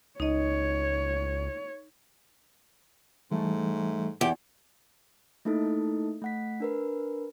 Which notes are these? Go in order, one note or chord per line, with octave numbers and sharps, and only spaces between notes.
C#2 D#4 C#5 D#5
G#2 E3 G3 A3
E2 G4
A3 A#3 D#4 E4 A4
A3 F#5 B6
D4 A#4 B4